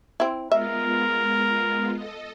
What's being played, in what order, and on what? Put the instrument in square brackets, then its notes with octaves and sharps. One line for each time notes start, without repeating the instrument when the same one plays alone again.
[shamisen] C4 E4
[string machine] G#3 B3 F4 [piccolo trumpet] A#4 [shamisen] E5
[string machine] A4 D#5